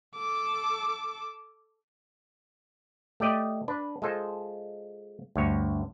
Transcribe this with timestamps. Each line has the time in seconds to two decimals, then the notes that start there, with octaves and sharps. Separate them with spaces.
0.15 A4 D6
3.20 A3 G4 D5 D#5 G5
3.68 D4 B4
4.02 G#3 F4 A4 C5
5.36 D2 G2 C#5